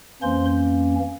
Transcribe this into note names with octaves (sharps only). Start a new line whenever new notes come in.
F2 E3 A#3 C#4 C5 C6